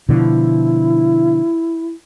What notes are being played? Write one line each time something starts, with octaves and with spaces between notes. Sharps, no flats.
B2 D3 F3 E4